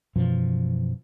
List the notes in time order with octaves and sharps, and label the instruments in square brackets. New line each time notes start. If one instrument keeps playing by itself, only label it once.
[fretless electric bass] F#2 B2 E3 F3